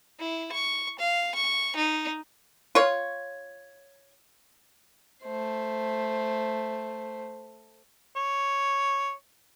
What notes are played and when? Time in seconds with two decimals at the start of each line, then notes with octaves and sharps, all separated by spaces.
0.20 E4
0.52 C#6
0.99 F5
1.35 C#6
1.77 D#4
2.75 F4 C#5
5.24 A3 C5
8.16 C#5